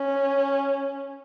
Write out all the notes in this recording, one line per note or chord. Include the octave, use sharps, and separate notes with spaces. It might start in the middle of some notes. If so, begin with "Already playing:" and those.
Already playing: C#4